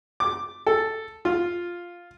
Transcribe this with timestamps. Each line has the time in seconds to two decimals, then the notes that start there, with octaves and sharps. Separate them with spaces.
0.20 D6
0.66 A4
1.25 F4